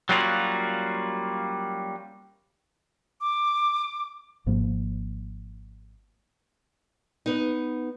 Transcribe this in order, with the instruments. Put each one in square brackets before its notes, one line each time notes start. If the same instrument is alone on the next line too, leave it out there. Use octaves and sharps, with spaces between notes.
[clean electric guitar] F#3 G3 A#3 C#4 F4 F#4
[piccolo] D6
[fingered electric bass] G#1 G#2 F3 A#3
[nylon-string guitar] B3 D#4